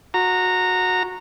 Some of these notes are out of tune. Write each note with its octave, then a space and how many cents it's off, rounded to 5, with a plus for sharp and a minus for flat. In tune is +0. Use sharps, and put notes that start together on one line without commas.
F#4 -20 A#5 -15